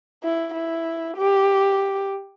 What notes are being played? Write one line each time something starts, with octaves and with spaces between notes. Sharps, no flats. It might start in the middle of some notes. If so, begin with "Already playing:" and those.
E4
E4
G4